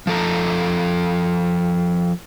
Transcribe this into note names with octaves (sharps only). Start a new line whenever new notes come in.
F3 A4 A#5